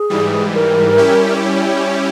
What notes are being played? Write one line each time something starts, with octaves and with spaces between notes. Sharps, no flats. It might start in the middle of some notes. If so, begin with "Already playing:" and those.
Already playing: G#4
G#2 E3 G3
A#4
G3 C#4 E4 G4
C#5